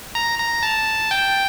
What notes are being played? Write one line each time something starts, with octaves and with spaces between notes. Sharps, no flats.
A#5
A#5
A5
G5